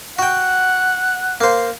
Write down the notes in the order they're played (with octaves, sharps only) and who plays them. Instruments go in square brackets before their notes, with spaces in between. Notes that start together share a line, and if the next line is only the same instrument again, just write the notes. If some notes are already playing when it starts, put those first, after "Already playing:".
[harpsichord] F#4 G5 [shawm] F#5
[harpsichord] A#3 C5